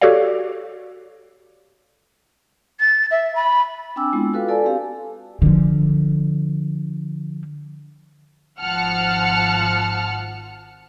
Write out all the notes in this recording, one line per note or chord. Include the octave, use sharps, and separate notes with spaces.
F#4 G4 A4 C#5 D5 F5
A6
E5
B5
C4 D4 G5 G#5 D6 E6
G#3 B3 C4 D4 E4 F4
F4 F#4 A4 B4 F5
A4 D5 G#5 A5
C4 G4 F5
D3 F3
G#1 F3 F#5 A5 F6 C#7